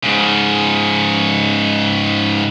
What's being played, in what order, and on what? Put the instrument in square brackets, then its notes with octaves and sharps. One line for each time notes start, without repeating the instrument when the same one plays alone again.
[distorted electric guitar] G#2 C#3